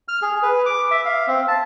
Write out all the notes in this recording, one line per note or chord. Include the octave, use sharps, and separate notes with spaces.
F6
G#4
B4
D6
E5
F5
C4
A5